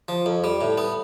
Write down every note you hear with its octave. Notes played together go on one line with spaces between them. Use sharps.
F3
F2
G3
A2
B3